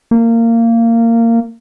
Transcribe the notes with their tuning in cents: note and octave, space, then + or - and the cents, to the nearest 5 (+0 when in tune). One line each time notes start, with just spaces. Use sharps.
A#3 -20